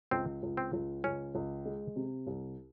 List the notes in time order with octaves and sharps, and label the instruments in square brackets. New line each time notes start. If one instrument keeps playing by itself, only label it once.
[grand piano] C#2 [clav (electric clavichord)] C4
[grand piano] C#2
[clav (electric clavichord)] C4
[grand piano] C#2
[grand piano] C#2 [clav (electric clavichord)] C#4
[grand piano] C#2
G#3
C3
C2